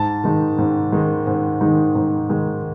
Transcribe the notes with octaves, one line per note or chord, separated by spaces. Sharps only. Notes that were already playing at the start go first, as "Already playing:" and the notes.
Already playing: G#2 A5
D#3 G#3 D#4
G#2
D#3 G#3 D#4
G#2
D#3 G#3 D#4
G#2
D#3 G#3 D#4